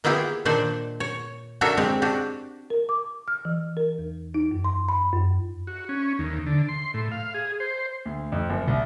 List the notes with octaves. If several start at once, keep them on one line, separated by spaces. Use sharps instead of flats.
A#3 B3 E4 F4 G4 G#4
A#2 D#3 D4 C5 D5
C#5
D4 F#4 A4 A#4 C#5 E5
G#3 C4 G4
D4 F#4 G4
A#4
D6
F6
E3
A#4
E2
D#4
F#2
C6
B5
F#2
F#4
C#4
D#2
D3
C6
A2
F5
G#4
C5
D2
F2
F#1
C2